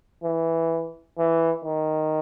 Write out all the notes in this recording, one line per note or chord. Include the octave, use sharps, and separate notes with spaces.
E3
E3
D#3